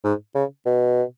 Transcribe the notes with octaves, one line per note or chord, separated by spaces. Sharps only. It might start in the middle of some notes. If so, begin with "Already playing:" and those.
G#2
C#3
B2